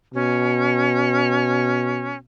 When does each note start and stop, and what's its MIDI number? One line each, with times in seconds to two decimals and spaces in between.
0.14 2.22 47
0.14 2.17 61